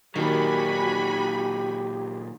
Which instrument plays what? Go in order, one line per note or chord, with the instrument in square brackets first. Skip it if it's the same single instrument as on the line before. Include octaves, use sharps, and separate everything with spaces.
[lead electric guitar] A#2 F#3 [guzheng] D#3 D#4 [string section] F#4 G#5 B5 [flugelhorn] G4